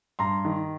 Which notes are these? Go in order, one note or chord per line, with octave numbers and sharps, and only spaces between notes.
G2 A#5 C6
D#3